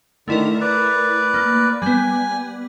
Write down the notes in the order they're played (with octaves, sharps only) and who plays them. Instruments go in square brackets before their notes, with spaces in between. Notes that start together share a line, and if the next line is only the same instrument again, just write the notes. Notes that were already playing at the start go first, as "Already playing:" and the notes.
[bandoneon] D3 D#3 [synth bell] A3 E4 A#4
[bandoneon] B4 D5
[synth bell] A#3
[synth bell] G3 B3 [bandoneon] G#5